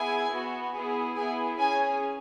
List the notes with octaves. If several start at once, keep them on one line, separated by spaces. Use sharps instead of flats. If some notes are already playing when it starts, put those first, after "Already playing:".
Already playing: B3 E4 G#4 G#5
B3 F#4
B3 E4 G#4
B3 E4 G#4 G#5
C#4 G#4 G#5